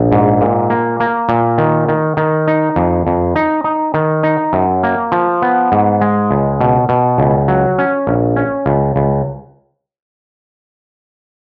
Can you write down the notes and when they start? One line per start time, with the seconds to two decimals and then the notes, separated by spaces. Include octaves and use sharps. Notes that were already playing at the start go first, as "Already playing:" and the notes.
Already playing: A#1
0.12 G#2
0.41 A#2
0.70 A#3
1.00 A#3
1.29 A#2
1.58 D#3
1.89 D#3
2.17 D#3
2.48 D#4
2.76 F2
3.07 F2
3.36 D#4
3.64 D#4
3.94 D#3
4.23 D#4
4.53 F#2
4.83 A#3
5.12 F3
5.42 B3
5.72 G#2
6.01 G#3
6.31 C#2
6.61 B2
6.89 B2
7.18 C#2
7.48 F#3
7.78 C#4
8.07 A#1
8.36 C#4
8.66 C#2
8.96 C#2